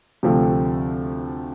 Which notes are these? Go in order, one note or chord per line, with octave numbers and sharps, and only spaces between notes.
D2 C3 F3 A3